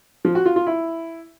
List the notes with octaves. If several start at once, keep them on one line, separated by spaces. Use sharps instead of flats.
F3
F#4
F4
F4
E4